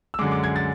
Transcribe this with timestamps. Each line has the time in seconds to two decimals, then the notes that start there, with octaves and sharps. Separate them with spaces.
0.14 E6
0.19 F#2 D3 G#3 D6
0.31 D6
0.44 G#6
0.56 A6